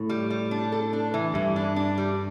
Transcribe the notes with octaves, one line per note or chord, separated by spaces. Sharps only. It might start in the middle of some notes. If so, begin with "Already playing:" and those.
Already playing: A2
G3
G3
D4
A4
D4
E3
G2 E3
D4
D4
G3